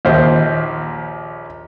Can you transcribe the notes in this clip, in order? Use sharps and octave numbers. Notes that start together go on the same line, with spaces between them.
A#1 D#2 C5